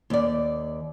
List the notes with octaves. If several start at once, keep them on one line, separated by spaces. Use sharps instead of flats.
D#2 D5